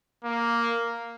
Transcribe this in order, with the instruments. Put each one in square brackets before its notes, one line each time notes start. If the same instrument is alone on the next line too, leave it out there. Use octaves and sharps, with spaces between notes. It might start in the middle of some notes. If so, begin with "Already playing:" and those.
[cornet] A#3